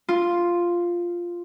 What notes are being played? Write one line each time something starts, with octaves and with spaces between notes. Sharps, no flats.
F4